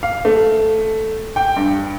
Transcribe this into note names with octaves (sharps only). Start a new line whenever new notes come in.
F5
A3
G5
G2